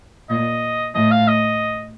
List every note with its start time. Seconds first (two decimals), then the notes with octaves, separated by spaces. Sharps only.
0.30 A#2 D#5
0.94 A2 D#5
1.11 F5
1.27 D#5